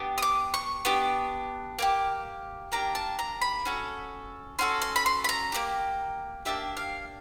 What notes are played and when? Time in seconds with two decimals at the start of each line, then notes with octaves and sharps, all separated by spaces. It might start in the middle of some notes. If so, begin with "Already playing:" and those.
Already playing: B3 D4 G4
0.18 D#6
0.22 D6
0.54 C#6
0.85 B3 D4 G4
1.79 A#3 D4 G4
2.72 A#3 D4 G4 A#5
2.95 A5
3.19 A#5
3.42 B5
3.65 C#4 F#4 A4
4.59 C#4 F#4 A4 C6
4.82 C6
4.96 B5
5.06 C6
5.24 B5
5.29 A#5
5.52 A#3 D4 G4
6.45 A#3 D4 G4 E5
6.77 F5